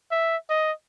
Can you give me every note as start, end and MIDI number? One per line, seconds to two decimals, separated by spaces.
0.11 0.37 76
0.50 0.72 75